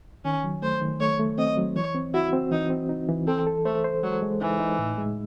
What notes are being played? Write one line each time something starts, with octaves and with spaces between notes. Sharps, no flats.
D#3 C#4
F#3
A3 C5
D#3
A3 C#5
A3
C4 D#5
F#3
E3 C#5
C4
E4 F#4
C4
E3 D#4
C4
D#4
E3
C4 A4
A4
A3 C5
C5
F#3 G#3
G#3
E3 D#4
D#4
A2
G#3